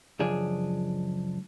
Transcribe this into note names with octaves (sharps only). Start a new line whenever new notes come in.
C#2 F#2 F3 D4 G#4